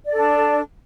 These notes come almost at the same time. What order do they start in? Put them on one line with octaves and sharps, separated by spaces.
D5 A4 D4